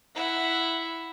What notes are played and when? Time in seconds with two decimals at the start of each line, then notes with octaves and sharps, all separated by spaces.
0.15 E4 F#5